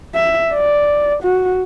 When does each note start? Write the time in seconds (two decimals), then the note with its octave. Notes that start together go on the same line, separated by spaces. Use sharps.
0.14 E5
0.54 D5
1.23 F#4